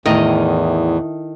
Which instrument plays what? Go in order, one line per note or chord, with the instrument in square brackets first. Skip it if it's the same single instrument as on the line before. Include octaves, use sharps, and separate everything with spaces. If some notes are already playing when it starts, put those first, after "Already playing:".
[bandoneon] E2 [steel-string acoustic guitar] A2 [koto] D#3 D#5